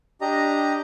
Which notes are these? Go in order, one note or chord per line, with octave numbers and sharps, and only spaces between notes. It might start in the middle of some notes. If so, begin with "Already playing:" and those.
D4 G4 D#5 A#5